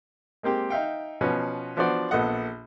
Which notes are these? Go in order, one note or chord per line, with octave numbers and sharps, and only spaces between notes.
G#3 A#3 C4 G4
D#4 E5 F5 G5
B2 F3 C#4 F#4 B4
F3 B3 D4 F#4 C5 D5
A#1 B3 A4 D#5 F#5